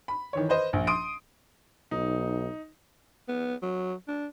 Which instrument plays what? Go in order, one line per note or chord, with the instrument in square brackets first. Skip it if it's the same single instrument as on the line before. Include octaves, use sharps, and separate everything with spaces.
[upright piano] B5
D#3 E3 C#5
B4 C5 D#5
A#1
C6 D#6 D7
[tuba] B1 [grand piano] D#4
[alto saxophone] B3
F#3
D4